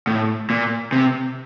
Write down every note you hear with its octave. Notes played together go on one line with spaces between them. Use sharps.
A2
A#2
C3